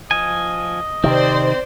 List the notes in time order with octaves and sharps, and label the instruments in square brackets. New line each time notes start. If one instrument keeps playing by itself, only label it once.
[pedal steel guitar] F3 G#5 [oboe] D#5
[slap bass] C3 D#3 [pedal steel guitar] C4 [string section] C5 D5